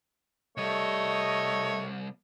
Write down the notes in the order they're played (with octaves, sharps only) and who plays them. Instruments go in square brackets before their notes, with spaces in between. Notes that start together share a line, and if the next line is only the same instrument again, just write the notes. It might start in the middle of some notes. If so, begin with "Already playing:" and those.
[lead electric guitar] C2 G3 [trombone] A3 [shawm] C#5 [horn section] D#5